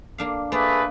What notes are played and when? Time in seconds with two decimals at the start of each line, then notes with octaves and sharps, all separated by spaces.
0.18 A#3 D4 F5
0.52 A3 A#3 G#4 B4 D5